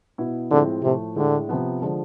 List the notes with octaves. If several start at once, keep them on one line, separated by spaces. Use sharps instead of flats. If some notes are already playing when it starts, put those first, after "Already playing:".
B2 B3 E4
A2 D3 F3 G#3 C4 E4
A2 C3 F3 A3
A2 D3 G#3 D4
C3 F3 B3
D3 F3 G#3